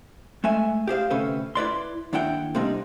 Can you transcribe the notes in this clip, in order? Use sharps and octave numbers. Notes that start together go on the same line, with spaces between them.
G#3 A3 E5 G#5
G4 G#4 C5 F5
D2 C3 C#4 A4 B4 C5
E4 B4 D5 C6
D#2 D4 E4 F#5 G5
C3 G3 A#3 C4 D4 D#4